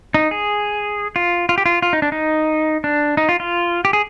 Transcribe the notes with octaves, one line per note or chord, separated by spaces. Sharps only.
D#4
G#4
F4
F4
G4
F4
F4
D#4
D4
D#4
D4
D#4
F4
F4
G4
G#4